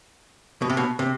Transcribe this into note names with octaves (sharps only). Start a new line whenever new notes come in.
B2
C3
B2
C3